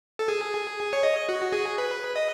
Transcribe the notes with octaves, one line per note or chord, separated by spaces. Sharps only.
A4
G#4
C#5
D#5
F#4
G#4
B4
D#5